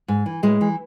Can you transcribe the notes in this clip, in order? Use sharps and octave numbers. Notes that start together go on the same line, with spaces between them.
G#2
E3
A2 G#3
E3